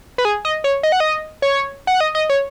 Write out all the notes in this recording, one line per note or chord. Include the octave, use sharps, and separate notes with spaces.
B4
G#4
D#5
C#5
D#5
F#5
D#5
C#5
F#5
D#5
D#5
C#5